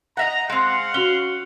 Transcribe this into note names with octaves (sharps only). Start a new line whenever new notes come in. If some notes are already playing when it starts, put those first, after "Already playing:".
D#5 E5 F#5 A#5
G#3 C4 F5 F#5
C#4 F#4 F7 G7